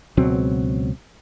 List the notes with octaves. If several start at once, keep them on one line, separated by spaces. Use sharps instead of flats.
C#2 B2 F#3 C4